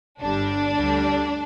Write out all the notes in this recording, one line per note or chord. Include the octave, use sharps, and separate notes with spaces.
G1 G2 D3 G3 D4
D2 D3 G3